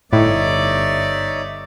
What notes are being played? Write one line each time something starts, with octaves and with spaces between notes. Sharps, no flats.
G1 A2 D#4 C#5 D5 E5